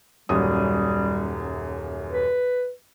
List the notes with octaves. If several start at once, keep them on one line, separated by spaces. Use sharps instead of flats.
D#1 F#2 G3 D#6
B4